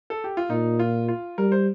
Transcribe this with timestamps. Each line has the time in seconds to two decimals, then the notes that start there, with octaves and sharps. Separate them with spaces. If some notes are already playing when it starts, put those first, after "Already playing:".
0.10 A4
0.24 G4
0.37 F4
0.50 A#2 D#4
0.79 F4
1.08 F4
1.38 G3 A#4
1.52 C5